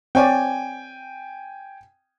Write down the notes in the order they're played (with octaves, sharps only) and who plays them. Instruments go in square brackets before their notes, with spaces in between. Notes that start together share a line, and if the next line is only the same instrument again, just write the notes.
[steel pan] C4 C#5 D5 [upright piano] G5 G#5